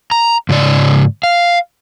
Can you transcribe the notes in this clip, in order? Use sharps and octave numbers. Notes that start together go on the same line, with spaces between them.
A#5
G#2 C#3 D5
F5